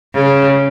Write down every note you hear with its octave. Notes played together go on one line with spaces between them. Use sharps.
C#3